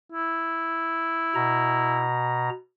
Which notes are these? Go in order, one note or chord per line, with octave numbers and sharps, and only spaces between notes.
E4
B2 A#5